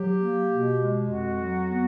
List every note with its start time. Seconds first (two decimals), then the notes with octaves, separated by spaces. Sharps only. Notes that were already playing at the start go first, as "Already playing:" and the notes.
Already playing: F#3 G4
0.19 A#3
0.49 B2
0.79 G#3
1.09 F2 F#4
1.39 F#3
1.70 B3